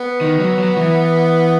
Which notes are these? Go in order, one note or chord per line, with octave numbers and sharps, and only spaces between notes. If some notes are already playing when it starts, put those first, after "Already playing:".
Already playing: B3
D#3
F#3
F#3
E3